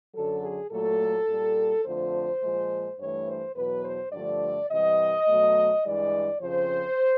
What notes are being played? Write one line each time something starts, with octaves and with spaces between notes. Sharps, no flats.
F#2 D3 F#3 A4
G#4
A#2 F#3 A3 A4
A#2 G3
F2 D3 F3 A3 C5
A#2 F3 G#3
G2 E3 A3 C#5
C5
E2 B2 F#3 B4
C5
G2 D3 F3 A3 D5
C3 E3 G3 D#5
B2 F#3 A3
G2 E3 G#3 D5
F2 C#3 F3 C5